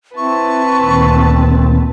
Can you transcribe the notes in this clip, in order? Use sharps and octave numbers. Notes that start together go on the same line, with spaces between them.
C4 E4 B4 A5 C#6
D2 A#2 D#3